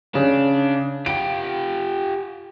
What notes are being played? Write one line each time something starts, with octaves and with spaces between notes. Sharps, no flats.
C#3 D4
F4 G4 D7